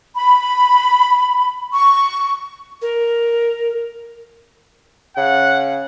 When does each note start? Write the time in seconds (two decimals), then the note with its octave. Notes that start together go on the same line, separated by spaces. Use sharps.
0.16 B5
1.73 C#6
2.81 A#4
5.17 C#3 F#5